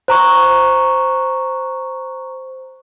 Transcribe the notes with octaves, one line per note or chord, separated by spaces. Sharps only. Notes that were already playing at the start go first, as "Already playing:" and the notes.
C5 A#5 C#6